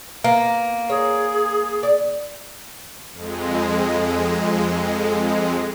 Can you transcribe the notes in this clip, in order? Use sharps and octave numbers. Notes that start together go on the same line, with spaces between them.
A#3 B3
G#4 C#5
D5
F2 G#3